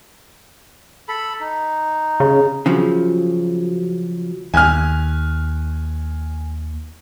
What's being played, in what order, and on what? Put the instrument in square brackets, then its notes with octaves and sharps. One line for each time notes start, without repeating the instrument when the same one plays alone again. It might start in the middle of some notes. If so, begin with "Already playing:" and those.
[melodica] A4 B5
D#4
[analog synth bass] C#3
[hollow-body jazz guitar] C#3 F3 F#3
[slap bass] D#2 [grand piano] G#5 F6